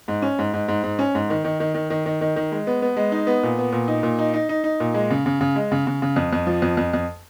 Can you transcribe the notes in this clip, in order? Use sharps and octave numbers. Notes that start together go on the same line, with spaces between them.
G#2
C#4
G#2
G#2
G#2
G#2
C#4
G#2
D#3
D#3
D#3
D#3
D#3
D#3
D#3
D#3
G#3
B3
B3
G#3
D#4
B3
A#2
B3
A#2
D#4
A#2
D#4
D#4
D#4
D#4
A#2
G#3
C#3
C#3
C#3
G#3
C#3
C#3
C#3
F2
F2
F3
F2
F2
F2